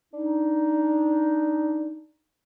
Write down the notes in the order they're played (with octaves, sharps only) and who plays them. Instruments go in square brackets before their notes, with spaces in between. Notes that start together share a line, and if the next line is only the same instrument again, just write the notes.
[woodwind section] D4 D#4